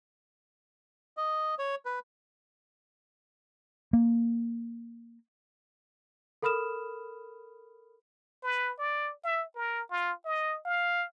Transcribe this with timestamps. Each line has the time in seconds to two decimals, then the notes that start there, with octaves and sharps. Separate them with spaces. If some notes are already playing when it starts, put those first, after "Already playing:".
1.17 D#5
1.59 C#5
1.85 B4
3.93 A#3
6.42 A4 A#4 B5 D#6 F6 E7
8.43 B4
8.79 D5
9.24 E5
9.55 A#4
9.90 F4
10.25 D#5
10.65 F5